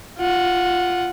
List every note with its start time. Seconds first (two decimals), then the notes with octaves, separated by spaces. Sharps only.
0.19 F4 F#5